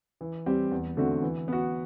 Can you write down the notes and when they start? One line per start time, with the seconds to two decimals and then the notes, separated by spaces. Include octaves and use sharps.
0.21 E3
0.46 G3 C4 G4
0.71 E2
0.97 D3 A3 C4 F#4
1.22 E3
1.48 B3 F#4